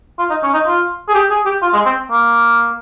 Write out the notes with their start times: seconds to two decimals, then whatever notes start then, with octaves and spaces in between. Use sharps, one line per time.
0.19 F4
0.30 D#4
0.43 C#4
0.54 D#4
0.67 F4
1.08 G#4
1.14 G4
1.30 G#4
1.45 G4
1.62 F4
1.73 G#3
1.85 C4
2.10 A#3